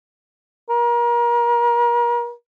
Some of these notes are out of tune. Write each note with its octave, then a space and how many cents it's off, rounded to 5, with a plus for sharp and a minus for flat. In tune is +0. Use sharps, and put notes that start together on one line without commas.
A#4 +35